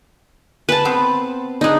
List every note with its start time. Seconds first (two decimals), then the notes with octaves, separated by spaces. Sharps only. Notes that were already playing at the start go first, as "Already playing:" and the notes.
0.69 B4 G#5 A5
0.85 B3 C4 C5
1.61 D4 D#4 G#4 D#5